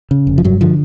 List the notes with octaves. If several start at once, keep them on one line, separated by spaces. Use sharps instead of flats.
C#3
F1
F3
G2 F#3
D3 F3